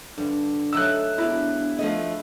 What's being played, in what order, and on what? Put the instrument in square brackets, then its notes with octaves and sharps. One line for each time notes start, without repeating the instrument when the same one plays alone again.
[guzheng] G2 [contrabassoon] D3
[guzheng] F#3 A3 D#4 [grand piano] E6 F#6
[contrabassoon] E1 [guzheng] D4 A#5 [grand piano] E4
[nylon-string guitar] F3 A3 D#5